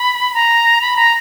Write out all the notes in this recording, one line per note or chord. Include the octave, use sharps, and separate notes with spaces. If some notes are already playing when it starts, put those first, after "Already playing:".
Already playing: B5
A#5
B5
A#5